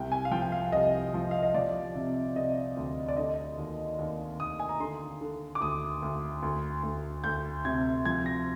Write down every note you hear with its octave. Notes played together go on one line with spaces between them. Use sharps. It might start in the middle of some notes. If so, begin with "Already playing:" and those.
Already playing: C2 G5
G#5
F5
F3 G5
G5
F5
C2 D#5
F3
F5
D#5
F3 D5
C3
C3 D#5
D2
D5
D3 D#5
D#2
D#2
D#2 D#6
G#5
A#5
D3 C6
D3
D6
D2 D#6
D2
D2
D2
D2 G6
C3 G#6
F3 G#6
A#6